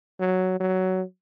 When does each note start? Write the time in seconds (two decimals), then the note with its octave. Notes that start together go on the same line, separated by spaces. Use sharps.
0.20 F#3
0.60 F#3